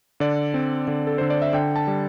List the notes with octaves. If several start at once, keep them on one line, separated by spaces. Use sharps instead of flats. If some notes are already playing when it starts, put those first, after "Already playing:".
D3 D5
C4
D3
A4
D3 C5
D5
E5
D3 G5
A5
G3